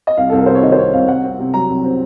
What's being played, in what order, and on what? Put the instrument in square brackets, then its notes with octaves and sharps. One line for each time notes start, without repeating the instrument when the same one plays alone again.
[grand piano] D#5
C2 F5
C2 A4
A#4
C3 C5
C#5
D#3 D#5
C5
C2 C#5
C2 F5
C2 F#5
C4
C3
F#3 A#5
C2
C4